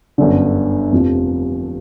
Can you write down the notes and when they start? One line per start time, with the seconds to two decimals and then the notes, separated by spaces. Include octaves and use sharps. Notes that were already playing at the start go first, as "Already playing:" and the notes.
0.18 G1 F#2 D3
0.92 F1 F2 C3 F3